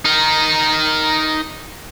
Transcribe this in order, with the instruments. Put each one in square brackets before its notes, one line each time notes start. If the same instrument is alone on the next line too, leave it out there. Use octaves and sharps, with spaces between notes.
[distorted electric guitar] D#4 A#4